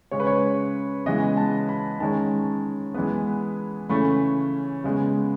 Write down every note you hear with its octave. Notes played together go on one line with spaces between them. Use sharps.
C#3 G#3 C#4 C#5
B4
C#5
C#3 E3 G#3 B3 D#5
A5
B5
D#3 G#3 C#4 A5
E3 G#3 B3
C#3 E3 A3 C#4 B5
C#3 G#3 B3